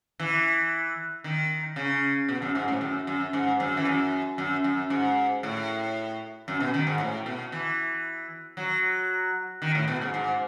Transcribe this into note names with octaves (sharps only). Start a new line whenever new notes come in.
E3
D#3
C#3
B2
F#2
G#2
A2
F#2
F#2
G#2
F#2
E3
F#2
F#2
F#2
G#2
A2
F#2
B2
D#3
G#2
A2
B2
E3
F#3
D#3
A2
B2
G#2
G#2